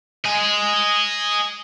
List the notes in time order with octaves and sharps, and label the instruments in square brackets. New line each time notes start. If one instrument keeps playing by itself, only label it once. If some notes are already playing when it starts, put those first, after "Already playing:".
[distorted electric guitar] D#5 G#5